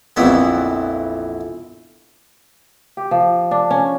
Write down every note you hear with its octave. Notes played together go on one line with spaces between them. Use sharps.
A#1 F2 E3 B3
G4
F3
D4
C#4